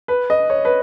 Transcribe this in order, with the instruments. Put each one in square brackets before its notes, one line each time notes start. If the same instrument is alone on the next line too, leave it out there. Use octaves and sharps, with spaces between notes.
[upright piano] B4
D#5
C#5
B4